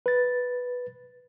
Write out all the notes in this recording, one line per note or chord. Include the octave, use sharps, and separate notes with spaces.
B4 A6